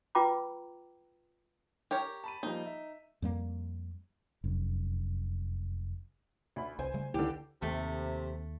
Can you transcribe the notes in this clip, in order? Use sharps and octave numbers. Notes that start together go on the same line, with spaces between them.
F4 B4 G5 A#5 B5 D6
G4 A#4 C#5
A5 B5 D#7
F3 G3 A#3 D#4
E5
F2 G3 A#3
F1 F#2
D2 B5
C2 C5 G#5
C#3 G3 A3
C#2 D3 E3 G4
D#2 C3 A3